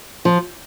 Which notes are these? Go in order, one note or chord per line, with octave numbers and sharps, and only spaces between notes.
F3